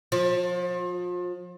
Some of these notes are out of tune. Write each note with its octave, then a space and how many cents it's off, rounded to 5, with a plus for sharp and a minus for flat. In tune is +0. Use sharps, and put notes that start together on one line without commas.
F3 +35